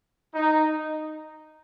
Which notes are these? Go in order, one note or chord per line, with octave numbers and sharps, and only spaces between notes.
D#4